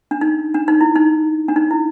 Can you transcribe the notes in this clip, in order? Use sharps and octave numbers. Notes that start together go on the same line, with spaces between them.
D4
D#4
D4
D#4
E4
D#4
D4
D#4
E4